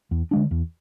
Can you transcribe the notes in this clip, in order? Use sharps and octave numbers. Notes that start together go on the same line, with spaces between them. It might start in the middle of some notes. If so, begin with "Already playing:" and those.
E2
D3 G#3 D4
E2